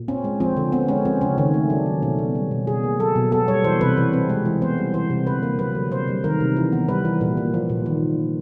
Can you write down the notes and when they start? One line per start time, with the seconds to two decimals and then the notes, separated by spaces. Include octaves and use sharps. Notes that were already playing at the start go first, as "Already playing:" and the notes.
Already playing: A#2
0.08 C4 C#4
0.24 G#3
0.40 F3 C4
0.57 D3
0.72 B3 C4
0.88 G#3 C#4
1.05 F3 C4
1.21 C#3 C#4
1.38 D#3 C#4
1.54 A3
1.70 F#3 D4
1.86 D#3
2.02 B2 C#4
2.19 B3
2.35 G3
2.51 B2
2.67 B2 G#4
2.83 A#3
2.99 F#3 A4
3.16 B2
3.32 B3 A4
3.48 G3 C#5
3.64 E3 C5
3.81 C3 B4
3.97 E3
4.13 C4
4.30 G#3
4.45 E3
4.62 B3 C5
4.78 G3
4.94 E3 C5
5.10 C3
5.27 D3 B4
5.43 A#3
5.59 F#3 B4
5.75 D3
5.91 C3 C5
6.08 G3
6.24 D#3 A#4
6.40 C3
6.57 E3
6.72 B3
6.88 G3 B4
7.05 E3
7.21 A#2
7.37 A#3
7.54 F3
7.70 A#2
7.86 D#3